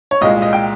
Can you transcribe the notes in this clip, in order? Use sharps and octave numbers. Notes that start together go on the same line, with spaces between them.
C#5
C2 A#2 G#3 D#5
D#5
G5